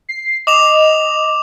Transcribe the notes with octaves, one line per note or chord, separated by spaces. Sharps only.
C7
D#5 D6 E7 F7